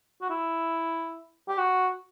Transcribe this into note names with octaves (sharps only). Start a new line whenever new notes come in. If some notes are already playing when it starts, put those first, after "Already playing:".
F#4
E4
G4
F#4